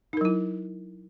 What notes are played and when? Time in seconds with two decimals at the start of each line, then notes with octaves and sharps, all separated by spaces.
0.13 D#4
0.17 A#4
0.21 F#3
0.25 E4